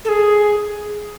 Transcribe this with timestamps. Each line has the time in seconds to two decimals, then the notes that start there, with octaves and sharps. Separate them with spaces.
0.05 A4
0.09 G#4